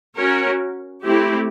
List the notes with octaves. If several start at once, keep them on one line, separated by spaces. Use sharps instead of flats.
C#4 F#4 A#4 C#5
A3 C4 E4 G4